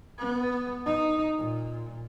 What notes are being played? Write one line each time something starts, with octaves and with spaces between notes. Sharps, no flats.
B3
D#4
A#2